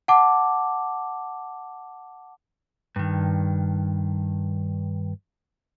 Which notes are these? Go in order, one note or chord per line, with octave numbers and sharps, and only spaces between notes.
F#5 A5 D6
G2 D#3